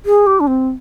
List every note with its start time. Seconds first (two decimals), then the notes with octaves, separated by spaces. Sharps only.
0.06 G#4
0.27 G4
0.40 D4
0.47 C4